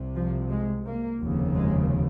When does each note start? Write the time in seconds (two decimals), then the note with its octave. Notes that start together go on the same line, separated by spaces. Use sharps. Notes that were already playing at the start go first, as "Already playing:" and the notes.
Already playing: C2 C3
0.15 F3
0.50 G#3
0.86 A#3
1.20 F1 D#2 C#3
1.55 G#3